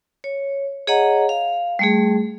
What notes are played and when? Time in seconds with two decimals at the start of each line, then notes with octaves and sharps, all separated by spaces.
0.24 C#5
0.87 G#4 C#5 D#5 F#5 A#5
1.29 F5
1.79 G3 A3 G#4